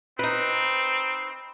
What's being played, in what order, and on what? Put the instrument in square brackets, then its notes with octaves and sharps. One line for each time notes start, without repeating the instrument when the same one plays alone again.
[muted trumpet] C4 [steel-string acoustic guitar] D#4 B4